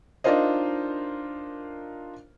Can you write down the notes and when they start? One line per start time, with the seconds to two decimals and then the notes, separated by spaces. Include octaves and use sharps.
0.24 D4 D#4 F4 A#4 C5 D#5